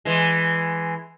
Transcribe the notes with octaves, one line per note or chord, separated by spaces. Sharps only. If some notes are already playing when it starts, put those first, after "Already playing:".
E3 G#3